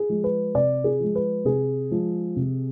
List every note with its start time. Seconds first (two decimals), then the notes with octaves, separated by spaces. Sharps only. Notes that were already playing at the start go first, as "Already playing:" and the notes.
Already playing: G#4
0.09 F3 G#3
0.24 B4
0.55 C3 D5
0.84 G#4
1.00 F3 G#3
1.15 B4
1.45 C3 G#4
1.91 F3 G#3
2.36 C3